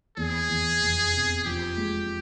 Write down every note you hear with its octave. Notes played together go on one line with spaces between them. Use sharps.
E2 G#4
E2
F1
C3
F3 G4
G#3